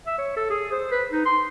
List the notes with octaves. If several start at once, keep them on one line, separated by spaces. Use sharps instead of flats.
E5
C#5
A4
G#4
C5
B4
D#4
C6